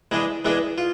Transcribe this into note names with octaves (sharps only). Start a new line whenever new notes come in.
E3 G#3 B3 D4 G#4
E3 G#3 B3 D4 G#4
F4